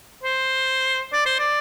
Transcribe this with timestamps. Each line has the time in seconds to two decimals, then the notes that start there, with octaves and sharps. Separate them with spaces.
0.24 C5
1.13 D5
1.26 C5
1.39 D5